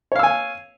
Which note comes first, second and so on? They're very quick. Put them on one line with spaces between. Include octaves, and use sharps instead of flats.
C#5 F5 E6 G#5